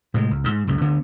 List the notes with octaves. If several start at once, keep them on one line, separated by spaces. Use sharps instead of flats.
A2 C3 G3 G#3
C#2
A1 G#2
C#2 F#2 C#3
D2 D3 B3